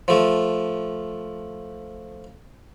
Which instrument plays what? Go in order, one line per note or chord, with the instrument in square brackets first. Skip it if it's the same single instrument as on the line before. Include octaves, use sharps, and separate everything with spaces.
[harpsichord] F3 A3